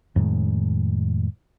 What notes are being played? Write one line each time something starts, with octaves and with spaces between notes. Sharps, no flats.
F2 A2 D#3 G#3